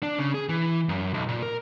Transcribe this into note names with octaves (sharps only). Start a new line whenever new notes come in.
D4
C#3
G#4
E3
F#2
B1
A#2
A#4